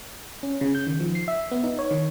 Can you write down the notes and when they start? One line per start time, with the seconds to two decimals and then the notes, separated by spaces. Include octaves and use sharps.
0.43 C#4
0.61 C#3
0.75 G6
0.86 D#3
1.00 F3
1.15 C7
1.28 E5
1.51 B3
1.64 D#4
1.79 C#5
1.91 D#3